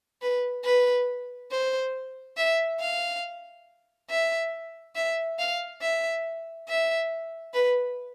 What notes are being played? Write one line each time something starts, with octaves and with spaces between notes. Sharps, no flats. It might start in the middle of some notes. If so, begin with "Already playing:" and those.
B4
B4
C5
E5
F5
E5
E5
F5
E5
E5
B4